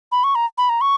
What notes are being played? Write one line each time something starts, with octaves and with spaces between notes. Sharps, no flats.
B5
C#6
A#5
B5
A#5
C#6